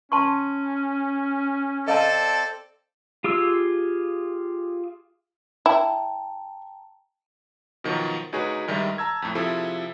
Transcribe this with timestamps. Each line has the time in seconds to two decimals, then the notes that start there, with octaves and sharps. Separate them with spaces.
0.12 C#4 A5 C6 C#6
1.88 C4 A4 D5 D#5 F5 A5
3.24 F4 G4 G#4 E6
5.66 E4 G5 A5 A#5
7.84 B2 D#3 F3 F#3
8.33 D2 D#4 F#4 G#4 B4 C#5
8.68 G2 D#3 G3 G#3 D#5 E5
8.98 A5 A#5 E6 G#6
9.22 F2 A2
9.35 C3 F3 E4 G#4 A4